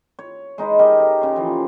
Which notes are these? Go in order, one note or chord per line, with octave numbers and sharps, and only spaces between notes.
C#5
G#3 D#4 G#4 B4
G4 A#4 C#5 D#5
A4 D#5 A#5
C#3 C6
E3 F3